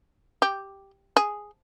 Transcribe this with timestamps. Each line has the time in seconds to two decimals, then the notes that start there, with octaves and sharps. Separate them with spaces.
0.42 G4
1.17 G#4